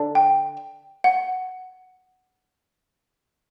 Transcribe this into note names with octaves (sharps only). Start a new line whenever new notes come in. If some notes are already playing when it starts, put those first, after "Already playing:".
Already playing: D3 D4
G5
F#5